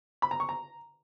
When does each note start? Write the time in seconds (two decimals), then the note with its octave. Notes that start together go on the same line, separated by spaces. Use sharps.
0.22 B5
0.31 A#5
0.40 C#6
0.49 A#5